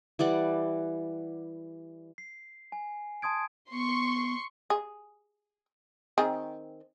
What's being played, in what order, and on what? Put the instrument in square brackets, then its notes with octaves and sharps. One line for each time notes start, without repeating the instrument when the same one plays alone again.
[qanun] E3 G3 D5 F#5
[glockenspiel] C7
G#5
A5 C6 D#6 G#6 D7
[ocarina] B3 [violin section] C6 C#6
[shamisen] G#4
D#3 C4 G#4